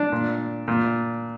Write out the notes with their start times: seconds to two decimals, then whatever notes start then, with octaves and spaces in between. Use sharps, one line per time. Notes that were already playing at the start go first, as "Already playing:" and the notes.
Already playing: D4
0.12 A#2
0.68 A#2